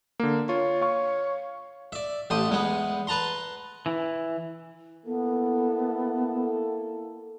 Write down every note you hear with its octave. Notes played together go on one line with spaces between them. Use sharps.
D3 A#3
F4 C#5
F5 C#6
D5 E5
A1 G4 A5 C6 D#6
E2 G#3 B3
B4 A5 A#5 C6
E3
A#3 B3 E4 A4